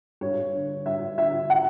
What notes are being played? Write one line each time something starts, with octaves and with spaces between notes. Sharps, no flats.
G2 C#5
D3
G2 E5
D3 E5
F#5